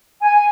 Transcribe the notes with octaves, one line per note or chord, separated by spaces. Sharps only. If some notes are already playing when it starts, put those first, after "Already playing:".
G#5